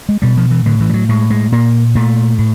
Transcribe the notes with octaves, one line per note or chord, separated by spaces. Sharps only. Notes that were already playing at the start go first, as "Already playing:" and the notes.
G#3
B2 G3
F3
E3
A2 D3
E3
G3
F#3
A2 G#3
G#3
A#2 A#3
A#2 A3
A2